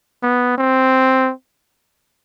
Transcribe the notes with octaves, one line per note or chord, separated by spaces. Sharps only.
B3
C4